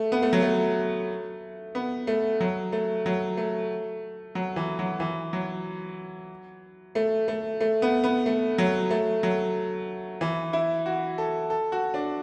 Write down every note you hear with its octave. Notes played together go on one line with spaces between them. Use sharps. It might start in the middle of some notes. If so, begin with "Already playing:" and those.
Already playing: A3
B3
A3
F#3
A3
B3
A3
F#3
A3
F#3
A3
F#3
E3
F#3
E3
F#3
A3
A3
A3
B3
B3
A3
F#3
A3
F#3
E3
E4
F#4
A4
A4
F#4
D4